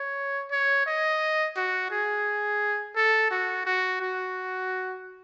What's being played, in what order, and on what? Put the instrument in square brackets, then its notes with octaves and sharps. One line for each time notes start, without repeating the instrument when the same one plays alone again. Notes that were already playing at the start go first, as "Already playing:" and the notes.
Already playing: [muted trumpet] C#5
C#5
D#5
F#4
G#4
A4
F#4
F#4
F#4